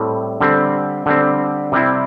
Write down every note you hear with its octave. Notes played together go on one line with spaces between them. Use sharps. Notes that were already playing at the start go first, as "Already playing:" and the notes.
Already playing: A2 G3 C4
D3 G3 C4
D3 G3 C4
C3 G3 C4 E4